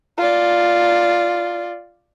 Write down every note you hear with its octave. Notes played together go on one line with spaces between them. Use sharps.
F4 D5